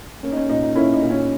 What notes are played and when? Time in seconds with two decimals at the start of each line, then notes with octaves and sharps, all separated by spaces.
0.23 A#3 C#4
0.32 D#4
0.36 C#4
0.49 A#2 D#4
0.63 D#4
0.75 A#3 C#4 E4
0.93 D#4
1.02 A#2
1.11 C#4